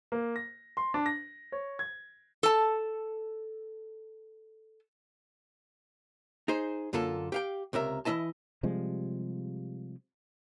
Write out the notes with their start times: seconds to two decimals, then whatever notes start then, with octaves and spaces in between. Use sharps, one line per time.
0.12 A#3
0.36 A#6
0.77 C6
0.94 D4
1.06 A#6
1.52 C#5
1.79 G#6
2.43 A4 A5
6.48 D#4 G#4 C5
6.93 F#2 D3 A#3 F4 A4
7.32 G4 F5 G5
7.73 C#2 C3 A#4 E5
8.05 E3 F3 E4 D#5 A5
8.63 C3 F3 G3 G#3